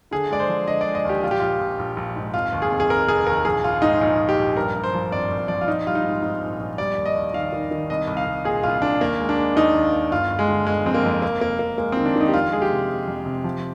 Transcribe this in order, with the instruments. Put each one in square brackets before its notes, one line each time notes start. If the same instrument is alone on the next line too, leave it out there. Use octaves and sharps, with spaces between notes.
[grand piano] D3 G#4
G#3 D5
C5
F3
D3 D#5
D5
G#3
D#5
D#2 G4
A#1 F4
G4
A#1 F4
A#1
A#1
A#1
G#2
F1 F4
D#2
G#4
F1
G#4
F1 A#4
F1 G#4
D#2 A#4
A#1 G#4
A#1 F4
G#2 D#4
A#1 D#4
A#1
G4
A#1
G2 A#4
G2
C5
F3
G#1 D5
G#1
F3 D5
F4
A#1 D#4
G3 F4
D#4
G#2
G#2
A#1
A#1
G3 D5
D#2
D#5
D#2
D#3 F5
D#3
D#3
C2 D#5
C2
F5
C2
A#2 G#4
C2 F4
A#2 D4
D#2 A#3
G#3
D4
G#3
D#2 D#4
D#2
D#2
G1 F4
G1
G#3
D3
G1 G#3
F2 C4
A#3
F2
F1 A#3
F1 A#3
F1 A#3
G#3 A#3
D#3 C4
D4
D#3 D#4
G4
F2 F4
G#3 G#4
G4
C3
G#3
F2
C3
F3